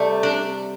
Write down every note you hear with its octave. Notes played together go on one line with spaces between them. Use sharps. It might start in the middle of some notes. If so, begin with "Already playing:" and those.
Already playing: C3 G3 A3
D4